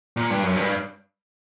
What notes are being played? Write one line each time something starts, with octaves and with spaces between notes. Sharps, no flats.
A#2
G2
F#2
G2